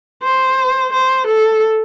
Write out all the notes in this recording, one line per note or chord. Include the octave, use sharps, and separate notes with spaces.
C5
C5
A4